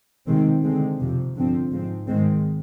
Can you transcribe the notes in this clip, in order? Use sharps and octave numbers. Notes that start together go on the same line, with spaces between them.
C3 D#3 G#3 C4
D3 G#3 C4
F2 C3 F3
G2 D3 F3 C4
G#2 F3 C4
G#2 D#3 G#3 C4